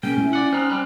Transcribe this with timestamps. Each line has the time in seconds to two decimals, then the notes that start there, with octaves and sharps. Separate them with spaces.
0.03 B2 G#3 A#3 C#4 G5
0.19 E4
0.33 D5 F#5
0.53 C4 D#4 F6 F#6
0.70 G3 C4